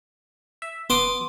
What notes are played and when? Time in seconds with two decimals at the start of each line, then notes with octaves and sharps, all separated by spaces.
0.62 E5
0.90 B3 C6 D6 D#6